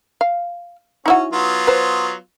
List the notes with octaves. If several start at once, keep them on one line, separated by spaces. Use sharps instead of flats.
F5
C#4 D#4 E4 F#4
F#3 B3 F4
B4 C5